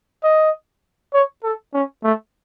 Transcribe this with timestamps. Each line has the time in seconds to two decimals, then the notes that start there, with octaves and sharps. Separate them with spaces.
0.23 D#5
1.14 C#5
1.43 A4
1.74 C#4
2.04 A3